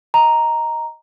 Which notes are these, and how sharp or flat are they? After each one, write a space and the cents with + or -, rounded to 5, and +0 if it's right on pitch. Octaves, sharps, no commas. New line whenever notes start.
D#5 +0 A#5 +0